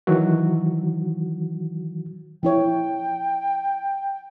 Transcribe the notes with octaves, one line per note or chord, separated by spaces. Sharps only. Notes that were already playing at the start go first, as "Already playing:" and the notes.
D#3 E3 F#3 F#4
F3 E4 C#5 G5